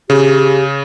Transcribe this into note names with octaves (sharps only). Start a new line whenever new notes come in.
C#3 G4 G#4